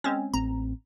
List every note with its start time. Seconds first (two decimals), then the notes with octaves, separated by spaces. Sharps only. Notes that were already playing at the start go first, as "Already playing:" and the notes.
0.04 G#3 C4 C#4
0.34 A1 C4 A#5